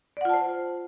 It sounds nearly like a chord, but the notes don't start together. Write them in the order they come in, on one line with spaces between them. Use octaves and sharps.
D5 F#5 F4 A5 C5